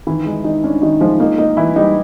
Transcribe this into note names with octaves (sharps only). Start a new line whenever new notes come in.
D#3 E3 E4
G#3 D#4
D#3 D#4
C#4 D4
D#3 D#4
F3 G#3 F4
A#3 D#4
A#3 D#4
E3 E4
G3 D#4